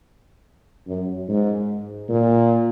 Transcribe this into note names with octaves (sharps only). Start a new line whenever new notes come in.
F#2
G#2
A#2